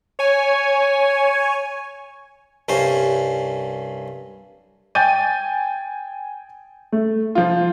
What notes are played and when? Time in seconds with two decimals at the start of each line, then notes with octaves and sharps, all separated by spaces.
0.19 C#5 G#5
2.69 C2 G2 C#4 C5
4.95 G5 G#5 G6 A6 D#7
6.92 A3
7.35 F3 F4